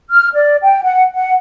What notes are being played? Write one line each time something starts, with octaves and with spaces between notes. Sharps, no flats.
F6
D5
G5
F#5
F#5